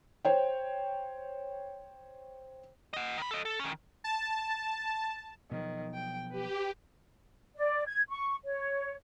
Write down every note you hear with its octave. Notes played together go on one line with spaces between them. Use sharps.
C5 C#5 G5
D#5 F#5
D#3 B5
A4 D#5
A4
D#3 C#4
A5
B2 D#3 F3 F#3
G5
G4 B4
D5
G#6
C#6
C#5